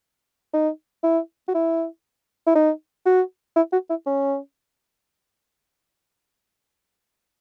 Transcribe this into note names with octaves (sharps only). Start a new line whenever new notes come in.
D#4
E4
F#4
E4
E4
D#4
F#4
E4
F#4
E4
C#4